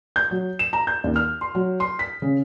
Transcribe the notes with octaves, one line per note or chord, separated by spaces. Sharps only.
G6
F#3
E7
A#5
G6
D#2
F6
C6
F#3
C6
B6
C#3